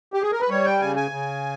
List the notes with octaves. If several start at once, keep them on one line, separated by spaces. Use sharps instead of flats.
G4
G#4
A#4
B4
G3 C#5
G5
C#3 G#5
G#5
C#3